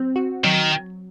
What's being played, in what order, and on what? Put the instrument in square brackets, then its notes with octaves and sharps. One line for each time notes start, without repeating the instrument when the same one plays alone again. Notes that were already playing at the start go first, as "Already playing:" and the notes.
Already playing: [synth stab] F#3 C4
F#4
[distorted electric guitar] D#3 [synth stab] F#3